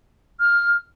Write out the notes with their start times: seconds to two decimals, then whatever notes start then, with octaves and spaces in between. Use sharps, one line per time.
0.40 F6